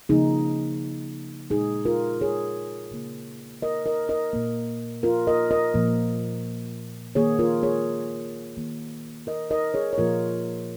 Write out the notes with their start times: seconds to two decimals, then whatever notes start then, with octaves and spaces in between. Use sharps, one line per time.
0.09 C#3 F3 A#3 D#4 G#4
1.50 A#2 G#3 D#4 G#4
1.85 F4 A#4
2.21 G#4 C#5
2.91 C#3 A#3
3.62 A#4 D#5
3.86 A#4 D#5
4.09 A#4 D#5
4.33 A#2 A#3
5.03 F4 A#4
5.27 A#4 D#5
5.51 A#4 D#5
5.74 A#2 F3 A#3
7.15 D#3 A#3 G#4 C#5
7.39 F4 A#4
7.63 G#4 C#5
8.57 D#3 A#3
9.27 A#4 D#5
9.51 A#4 D#5
9.74 G#4 C#5
9.93 C#5
9.98 A#2 F3 A#3 F4 A#4